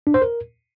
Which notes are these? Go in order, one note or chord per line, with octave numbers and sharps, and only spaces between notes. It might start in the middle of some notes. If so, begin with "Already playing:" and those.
D4
C5
A#4